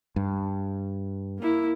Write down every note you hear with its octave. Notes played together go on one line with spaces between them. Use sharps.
G2
A#3 E4